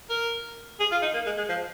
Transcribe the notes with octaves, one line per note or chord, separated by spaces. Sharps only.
A#4
G#4
F4
D#4
A#3
G#3
G#3
F3